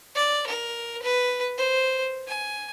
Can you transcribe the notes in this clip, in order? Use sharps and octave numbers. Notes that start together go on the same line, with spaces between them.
D5
A#4
B4
C5
G#5